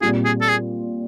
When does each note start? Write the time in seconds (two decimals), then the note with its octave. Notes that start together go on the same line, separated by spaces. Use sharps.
0.01 A#2 G3 C4 F4 G#4
0.25 G#4
0.41 A4
0.48 G#4